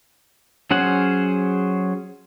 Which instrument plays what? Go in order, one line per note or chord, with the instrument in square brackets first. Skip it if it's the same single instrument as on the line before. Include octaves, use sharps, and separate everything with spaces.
[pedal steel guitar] F#3 C#4 G#4 C5 F#5